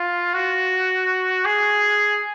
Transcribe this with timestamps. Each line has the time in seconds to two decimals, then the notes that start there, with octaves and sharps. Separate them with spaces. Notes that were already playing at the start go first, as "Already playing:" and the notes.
Already playing: F4
0.34 F#4
1.45 G#4